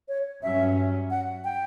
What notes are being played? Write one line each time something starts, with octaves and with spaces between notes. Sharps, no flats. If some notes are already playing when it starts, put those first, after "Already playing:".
C#5
G2 F#3 C#4 E5
F#5
G5